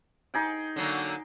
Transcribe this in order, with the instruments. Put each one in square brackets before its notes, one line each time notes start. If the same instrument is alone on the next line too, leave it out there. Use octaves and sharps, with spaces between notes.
[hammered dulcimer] D#4 G#4 G5
[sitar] D3 F#3 A#3